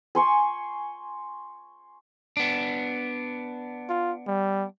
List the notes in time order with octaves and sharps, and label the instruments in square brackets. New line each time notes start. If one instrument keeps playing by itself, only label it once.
[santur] G#5 C6 C#6
[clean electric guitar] B3 D4
[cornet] F4
G3